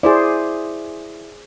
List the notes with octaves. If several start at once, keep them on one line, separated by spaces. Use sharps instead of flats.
E4 G#4 C5 D5